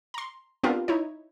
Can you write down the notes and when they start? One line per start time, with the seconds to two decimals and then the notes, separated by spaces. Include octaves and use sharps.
0.14 A#5 C6
0.63 B3 C4 D4 F4 G4 A#4
0.88 D#4 E4 C#5